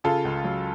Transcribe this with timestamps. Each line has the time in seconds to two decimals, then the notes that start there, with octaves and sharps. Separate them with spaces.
0.04 C#3 F4 A4
0.25 C#2
0.44 F#3